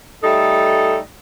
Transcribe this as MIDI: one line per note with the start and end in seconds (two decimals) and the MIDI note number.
0.23 0.98 55
0.23 0.98 57
0.23 0.98 63
0.23 0.98 69